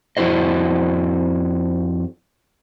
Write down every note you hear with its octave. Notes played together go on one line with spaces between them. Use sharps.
F2 E4 F#4 C5 D#5